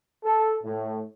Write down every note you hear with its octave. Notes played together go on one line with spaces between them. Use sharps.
A4
A2